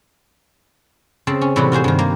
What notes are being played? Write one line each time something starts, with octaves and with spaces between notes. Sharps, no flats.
C#3 C4 A5
C#4
A2 C3 E3 G3 B3 F#4
F4 F#4 G#4 C5
G2 D#3
A#3